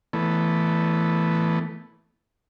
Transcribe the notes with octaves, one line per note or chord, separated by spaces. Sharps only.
E3 A3 B3